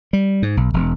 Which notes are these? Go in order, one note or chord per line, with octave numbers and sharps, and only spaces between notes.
G3
G#2
B1
E1